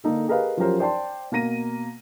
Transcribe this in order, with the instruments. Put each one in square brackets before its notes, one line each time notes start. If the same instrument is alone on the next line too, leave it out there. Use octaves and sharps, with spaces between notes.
[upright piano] D3 A#3 D#4 A4
G4 G#4 A#4 B4 D#5 F5
F3 F#3 C#4 G4 A#4 C5
C5 D5 G5 A5 C6
B2 A#3 A#5 A#6 D#7